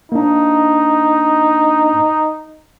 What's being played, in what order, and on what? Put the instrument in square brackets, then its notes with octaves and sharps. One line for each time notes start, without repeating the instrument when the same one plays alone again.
[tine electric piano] A#3 D4 [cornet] D#4